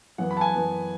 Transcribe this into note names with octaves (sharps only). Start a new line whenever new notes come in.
F#2 E3 B3 F#5
B5
A5
G#5
F#2 E3 B3